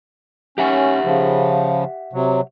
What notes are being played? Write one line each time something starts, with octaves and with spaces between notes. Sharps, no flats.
C#4 G4 E5 F#5
C#3 F3
C3 F#3